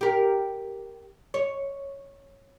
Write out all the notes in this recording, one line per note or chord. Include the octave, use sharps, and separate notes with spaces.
G4 A#4
C#5